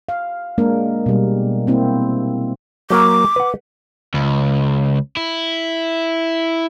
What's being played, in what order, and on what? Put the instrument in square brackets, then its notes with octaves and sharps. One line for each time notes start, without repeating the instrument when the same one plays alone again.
[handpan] F5
G#3 A#3 D4 A#4
B2 G3
A#3 C4 E4
[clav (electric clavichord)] F#3 A#3 A#4 [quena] D6
[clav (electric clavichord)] B4 F#5
[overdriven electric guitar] C#2
E4